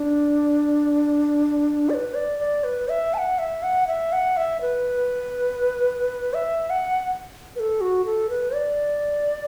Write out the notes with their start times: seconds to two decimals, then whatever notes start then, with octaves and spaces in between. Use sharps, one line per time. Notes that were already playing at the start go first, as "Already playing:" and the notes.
Already playing: D4
1.90 D5
1.94 B4
2.14 D5
2.39 D5
2.64 B4
2.89 E5
3.14 A5
3.18 F#5
3.39 E5
3.63 F#5
3.87 E5
4.12 F#5
4.37 E5
4.61 B4
6.34 E5
6.70 F#5
7.56 B4
7.60 A4
7.81 F#4
8.05 A4
8.30 B4
8.54 D5